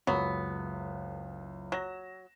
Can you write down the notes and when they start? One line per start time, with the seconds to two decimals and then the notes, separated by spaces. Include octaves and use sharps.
0.07 F#1 C#2 F#2 F#3 B3
1.72 F#3 A#6 E7